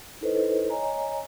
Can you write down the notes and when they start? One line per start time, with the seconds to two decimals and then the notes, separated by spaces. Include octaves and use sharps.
0.21 D#4 E4 A4 B4 C5 D#5
0.70 C#5 D#5 G#5 A#5